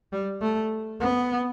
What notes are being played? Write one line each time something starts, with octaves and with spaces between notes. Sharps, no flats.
G3
A3
B3